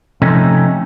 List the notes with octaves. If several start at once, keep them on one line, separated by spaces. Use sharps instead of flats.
C3 F3 A3 C#4 D#4